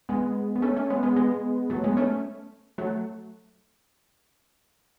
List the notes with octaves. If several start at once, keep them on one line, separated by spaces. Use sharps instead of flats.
G#3 B3
B3
A3 C#4
A3 C#4
G#3 B3
G#3 B3
G#3 B3
F#3 A3
G#3 B3
A3 C#4
F#3 A3